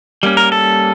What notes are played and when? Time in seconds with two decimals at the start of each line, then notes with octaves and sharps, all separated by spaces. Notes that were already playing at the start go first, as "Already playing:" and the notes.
0.23 G3 A#3 C#4
0.37 A#4
0.52 A4